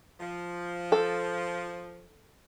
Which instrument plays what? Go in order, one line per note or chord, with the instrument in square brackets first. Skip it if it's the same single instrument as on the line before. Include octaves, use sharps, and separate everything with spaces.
[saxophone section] F3
[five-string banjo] A4